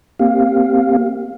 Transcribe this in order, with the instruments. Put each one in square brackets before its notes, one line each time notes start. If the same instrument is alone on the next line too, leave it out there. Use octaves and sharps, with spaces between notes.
[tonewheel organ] A#3 C4 G4 F5